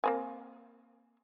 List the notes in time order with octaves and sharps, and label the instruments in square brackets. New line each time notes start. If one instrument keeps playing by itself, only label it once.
[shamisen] A#3 C4 G#5